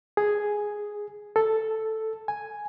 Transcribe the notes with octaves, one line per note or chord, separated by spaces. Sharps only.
G#4
A4
G#5